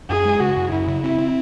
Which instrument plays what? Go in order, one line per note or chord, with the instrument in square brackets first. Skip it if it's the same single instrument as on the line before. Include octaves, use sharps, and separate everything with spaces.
[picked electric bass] F#2 [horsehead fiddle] G#4
[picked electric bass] G#3
[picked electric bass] C#3 [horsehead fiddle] F#4
[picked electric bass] F#2
[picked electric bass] F#2 [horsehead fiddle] E4
[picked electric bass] C#3
[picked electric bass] C4 [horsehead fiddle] E4
[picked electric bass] C4